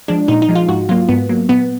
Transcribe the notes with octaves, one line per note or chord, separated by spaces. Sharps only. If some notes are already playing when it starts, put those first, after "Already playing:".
F3 G#3 D4
A#2 D#4
D#4
F3 G#3
F4
G#2 F#4
F#3 A#3 F4
G#2 B3
F#3 A#3
A#2 B3